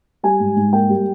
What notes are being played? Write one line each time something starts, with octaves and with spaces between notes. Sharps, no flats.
G3 G#5
G#2
G#2
A#3 G5
G3